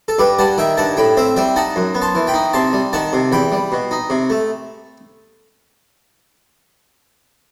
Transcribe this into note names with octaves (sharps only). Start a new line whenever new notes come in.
A4
G2 G4 B4
G3 F#5 A5
D#3 E5 G5
G2 F#5 A5
A2 G5 B5
C4 C5 E5
G3 E5 G5
D#4 F#5 A5
F#2
B3
A5 C6
E3
G5 B5
D#4
C3 A5 C6
G3
D#3 F#5 A5
C3
E2 G5 B5
G3
B2
D#4
C3
A3